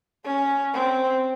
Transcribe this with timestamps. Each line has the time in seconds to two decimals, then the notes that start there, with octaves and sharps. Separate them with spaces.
0.25 C#4
0.74 C4